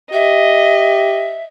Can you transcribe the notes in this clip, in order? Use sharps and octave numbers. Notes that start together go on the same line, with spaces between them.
G4 D#5 E5